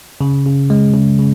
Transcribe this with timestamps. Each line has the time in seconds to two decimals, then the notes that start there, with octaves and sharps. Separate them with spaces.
0.21 C#3
0.46 C#3
0.70 G#3
0.94 C#3
1.19 C#3